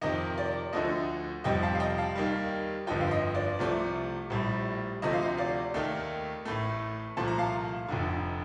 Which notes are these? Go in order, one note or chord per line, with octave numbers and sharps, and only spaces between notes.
F2 C3 D#3 D#5
D5
D2 D3 F3 A3 D#5
F1 F2 C3 G3 D#5 G5
F5 A5
F5
D#5 G5
F5 A5
D#2 D#3 G3
G1 F2 D3 F3 D#5 G5
F5
D#5
D5
C2 C3 F3 A3
A#1 A2 G3
D2 C3 F3 A3 D#5
F5
D#5
D5 F5
D#2 D#3 A3
A1 A2 A3
C2 A#2 F3 A3 A5
A#5
F5 A5
F1 F2 D3